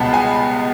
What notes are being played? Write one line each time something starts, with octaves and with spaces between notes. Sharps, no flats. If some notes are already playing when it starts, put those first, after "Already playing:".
Already playing: C#2 B2 G3 B3 A5 B5
G#5